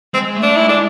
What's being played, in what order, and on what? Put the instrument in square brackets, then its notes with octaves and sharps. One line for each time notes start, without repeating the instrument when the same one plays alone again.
[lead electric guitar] G#3 [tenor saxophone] C4
[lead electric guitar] A3
[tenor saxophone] D4
[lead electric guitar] G#3 [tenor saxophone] E4
[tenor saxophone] D4